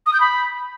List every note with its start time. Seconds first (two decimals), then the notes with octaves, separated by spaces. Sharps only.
0.06 D#6
0.13 G6
0.20 B5